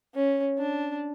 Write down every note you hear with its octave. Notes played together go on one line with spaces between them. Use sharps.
C#4
D4